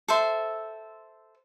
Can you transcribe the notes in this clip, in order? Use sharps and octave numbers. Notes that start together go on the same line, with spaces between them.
A4 C5 E5 C6